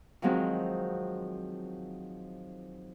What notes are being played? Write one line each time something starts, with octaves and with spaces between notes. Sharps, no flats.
D#3 F3 F#3 G#3 C4